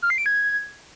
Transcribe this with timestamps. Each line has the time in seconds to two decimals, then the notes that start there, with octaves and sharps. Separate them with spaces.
0.02 F6
0.10 C7
0.18 D7
0.26 G#6